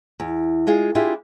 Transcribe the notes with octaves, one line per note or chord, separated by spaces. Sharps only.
E2
G#3 F4 G#4
D4 E4 F4 G4 G#4